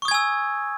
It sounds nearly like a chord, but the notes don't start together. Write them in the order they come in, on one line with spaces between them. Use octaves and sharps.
C#6 D#6 G#6 G#5 E6